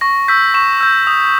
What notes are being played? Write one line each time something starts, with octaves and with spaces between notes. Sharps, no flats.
C#6 A#6
E6 G6 B6
C#6 E7
E6 G6
D#6